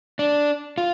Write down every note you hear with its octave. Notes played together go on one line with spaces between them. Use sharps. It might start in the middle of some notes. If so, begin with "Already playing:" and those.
D4
F4